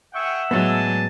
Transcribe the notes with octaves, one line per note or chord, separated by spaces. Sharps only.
G#4 E5 F#5 G5 C#6 E6
A2 F#3 G#3 B3 D4 G#5 A5